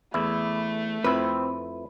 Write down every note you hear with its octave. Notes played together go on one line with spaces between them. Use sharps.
E2 A3 E4
F2 C4 E4 B4